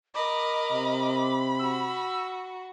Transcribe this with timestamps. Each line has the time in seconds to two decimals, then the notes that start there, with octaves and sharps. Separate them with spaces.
0.15 A#4 D#5 B5 D6
0.72 C3
1.59 F#4 E6